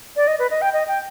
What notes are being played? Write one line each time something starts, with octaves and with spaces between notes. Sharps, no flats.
D5
D#5
B4
D#5
G5
D#5
G5